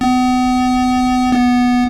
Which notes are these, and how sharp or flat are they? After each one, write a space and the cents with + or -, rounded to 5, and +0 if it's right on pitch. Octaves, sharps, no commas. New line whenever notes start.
B3 +35
B3 -5